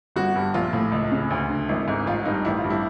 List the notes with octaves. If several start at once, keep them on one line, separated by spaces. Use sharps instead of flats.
G1 F#4
G2
A#1 F4
A2
C#2
C#3
D2
D3
G#1 E4
G#2
A1 F4
G2 D#4
A1 E4
F4
G2
E4